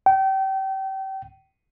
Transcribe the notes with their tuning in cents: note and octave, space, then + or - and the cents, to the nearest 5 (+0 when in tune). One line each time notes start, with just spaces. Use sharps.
G5 -30